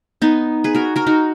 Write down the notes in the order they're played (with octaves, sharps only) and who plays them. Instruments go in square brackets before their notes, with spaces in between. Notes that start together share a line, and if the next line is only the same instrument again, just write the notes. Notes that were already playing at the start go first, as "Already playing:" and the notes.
[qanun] B3 D#4
G#4 B4
F#4 A#4
F#4 A#4
D#4 F#4